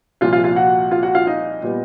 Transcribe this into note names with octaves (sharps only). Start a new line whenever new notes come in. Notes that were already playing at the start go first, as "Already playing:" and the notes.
C2 A#2 F3 F4 F5
F4 F5
F4 F5
F#4 F#5
F4 F5
F#4 F#5
F4 F5
D#4 D#5
A#2 G3 B3